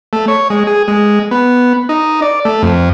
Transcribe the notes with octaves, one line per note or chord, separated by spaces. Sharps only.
A3
C#5
G#3
G#4
G#3
B3
D#4
D5
A3
F2